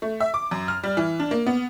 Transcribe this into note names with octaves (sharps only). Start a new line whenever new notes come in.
A3
E5
D6
F#2
F6
G3
E3
D4
A#3
B3